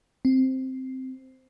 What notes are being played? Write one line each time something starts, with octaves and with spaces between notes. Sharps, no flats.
C4